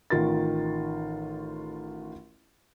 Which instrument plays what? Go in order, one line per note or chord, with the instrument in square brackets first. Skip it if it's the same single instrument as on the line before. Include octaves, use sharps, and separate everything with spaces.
[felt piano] A1 D#3 F4 A#4 A6